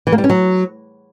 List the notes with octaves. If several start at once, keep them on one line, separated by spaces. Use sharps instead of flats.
E3
A#3
G3
C#4
F#3